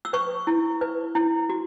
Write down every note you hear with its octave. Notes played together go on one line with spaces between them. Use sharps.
E6
B4 C#6
E4
B4
E4
F#4